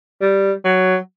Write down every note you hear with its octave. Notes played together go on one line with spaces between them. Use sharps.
G3
F#3